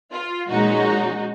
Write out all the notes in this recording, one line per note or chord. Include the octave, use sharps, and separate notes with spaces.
F4
A#2 F3 G#3 C#4 D#4 F#4